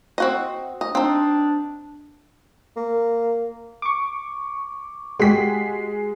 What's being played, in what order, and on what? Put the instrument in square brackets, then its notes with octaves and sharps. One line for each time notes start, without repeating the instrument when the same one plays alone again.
[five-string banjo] C4 F#4 D#5
D#5
[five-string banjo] C4 D#4 [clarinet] D4
[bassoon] A#3
[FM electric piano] C#6 D6
[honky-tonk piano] G#3 B6 [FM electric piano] F#4 G4